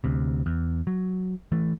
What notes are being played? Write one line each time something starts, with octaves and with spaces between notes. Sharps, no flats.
D2 C3
E2
F#3
E3 A3